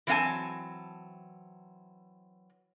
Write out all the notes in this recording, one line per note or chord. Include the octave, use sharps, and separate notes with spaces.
E3 F#3 C4 E5 G#5 A5